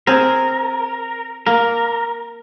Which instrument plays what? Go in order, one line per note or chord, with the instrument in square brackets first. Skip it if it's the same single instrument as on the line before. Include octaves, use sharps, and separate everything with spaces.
[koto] C4 G#4 [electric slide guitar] A#4
[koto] A#3 [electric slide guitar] A#4